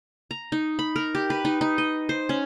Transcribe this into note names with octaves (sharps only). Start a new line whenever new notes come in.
A#5
D#4
B5
A#4
G4
B4
D#4
D#4
D#5
C5
C#4